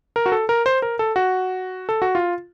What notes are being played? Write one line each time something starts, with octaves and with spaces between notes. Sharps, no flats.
A#4
F#4
A4
A#4
C5
A#4
A4
F#4
A4
F#4
F4